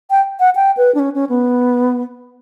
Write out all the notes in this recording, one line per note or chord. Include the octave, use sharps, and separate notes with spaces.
G5
F#5
G5
B4
D4
C#4
C#4
B3